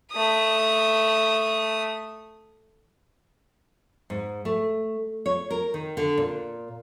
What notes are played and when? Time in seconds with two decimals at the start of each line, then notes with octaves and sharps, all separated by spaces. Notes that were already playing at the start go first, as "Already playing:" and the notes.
0.12 A3 D#6
4.10 G#2
4.45 A3
5.26 C#5
5.51 A#4
5.74 D#3
5.97 D3
6.18 A#2